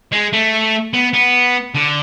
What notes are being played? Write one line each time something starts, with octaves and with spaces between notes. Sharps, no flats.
G#3
A3
B3
B3
D3